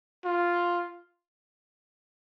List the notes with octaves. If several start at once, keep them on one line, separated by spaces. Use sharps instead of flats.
F4